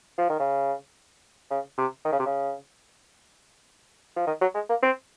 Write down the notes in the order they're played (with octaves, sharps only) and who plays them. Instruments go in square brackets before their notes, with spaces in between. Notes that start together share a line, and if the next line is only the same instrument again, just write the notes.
[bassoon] F3
D#3
C#3
C#3
C3
D#3
C#3
C3
C#3
F3
D#3
F#3
G#3
A#3
C4